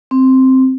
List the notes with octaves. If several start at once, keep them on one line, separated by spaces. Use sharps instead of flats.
C4